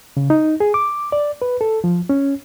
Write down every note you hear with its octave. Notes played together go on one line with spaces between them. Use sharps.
C#3
D#4
G#4
D6
D5
B4
A4
F3
C#4